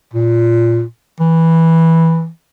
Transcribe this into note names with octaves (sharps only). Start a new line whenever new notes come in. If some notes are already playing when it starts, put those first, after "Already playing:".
A#2
E3